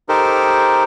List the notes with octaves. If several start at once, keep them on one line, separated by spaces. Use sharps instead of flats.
D#4 G4 A4 A#4 C5